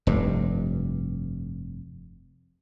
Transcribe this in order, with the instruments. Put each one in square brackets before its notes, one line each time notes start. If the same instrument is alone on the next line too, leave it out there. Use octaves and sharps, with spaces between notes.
[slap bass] F1 G2